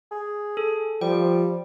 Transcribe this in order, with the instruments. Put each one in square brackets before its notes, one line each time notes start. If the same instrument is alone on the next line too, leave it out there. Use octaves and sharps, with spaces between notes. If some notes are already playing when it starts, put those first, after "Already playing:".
[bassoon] G#4
[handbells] A4
[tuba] F3 [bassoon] G3 [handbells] G5